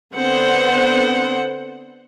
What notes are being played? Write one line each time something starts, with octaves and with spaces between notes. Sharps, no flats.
D3 B3 C4 C5 F#5